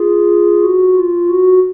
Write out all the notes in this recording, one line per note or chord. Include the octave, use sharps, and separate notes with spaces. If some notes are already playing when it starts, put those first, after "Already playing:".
Already playing: F4 G#4
F#4
F4
F#4